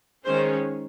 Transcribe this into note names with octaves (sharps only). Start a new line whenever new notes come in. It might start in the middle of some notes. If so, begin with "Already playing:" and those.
D#3 G#3 C#4 C5